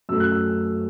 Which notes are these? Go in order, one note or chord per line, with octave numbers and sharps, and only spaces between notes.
F#2 F#3 A3 E6
F#6
E6